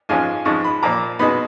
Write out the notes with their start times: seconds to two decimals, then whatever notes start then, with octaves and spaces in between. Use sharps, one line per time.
0.09 G#2 F3 G#3 C#4 F4 G#5
0.45 G#2 F3 G#3 C#6
0.64 B5
0.82 A#2 F3 A#3 A#5
1.19 B2 G#3 B3 D#4 B5